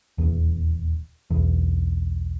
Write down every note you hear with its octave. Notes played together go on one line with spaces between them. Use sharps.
D#1 E2
B1 E2